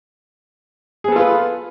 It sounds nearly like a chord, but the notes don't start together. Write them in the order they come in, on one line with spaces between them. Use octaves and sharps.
G#4 B3 A4 F4 B4